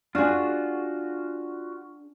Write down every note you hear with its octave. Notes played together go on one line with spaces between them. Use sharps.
D4 F4 F#4 G#4